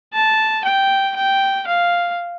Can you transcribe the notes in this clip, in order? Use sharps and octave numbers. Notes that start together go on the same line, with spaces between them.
A5
G5
G5
F5